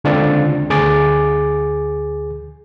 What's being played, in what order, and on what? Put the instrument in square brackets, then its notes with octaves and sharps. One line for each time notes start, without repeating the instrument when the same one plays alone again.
[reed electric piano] C#2 D3 C4 D4 F4 A6
D2 G#4 D6 A6